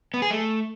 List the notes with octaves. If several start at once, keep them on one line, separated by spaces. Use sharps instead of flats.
B3
G#4
A3